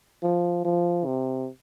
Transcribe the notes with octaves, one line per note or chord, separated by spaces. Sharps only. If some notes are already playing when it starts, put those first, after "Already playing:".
F3
F3
C3